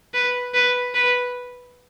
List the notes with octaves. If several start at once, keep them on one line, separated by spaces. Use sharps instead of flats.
B4
B4
B4